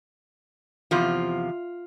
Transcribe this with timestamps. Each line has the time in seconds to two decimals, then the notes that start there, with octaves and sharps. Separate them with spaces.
0.91 E2 C3 F3 F4